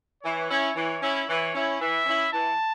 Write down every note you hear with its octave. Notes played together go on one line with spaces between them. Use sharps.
E3 C#5
C#4 E4
E3
C#4 E4
E3 C#5
C#4 E4
E3 E5
C#4 E4
E3 A5